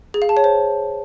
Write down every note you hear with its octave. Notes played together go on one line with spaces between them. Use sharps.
G#4
F5
A5
C#5
C5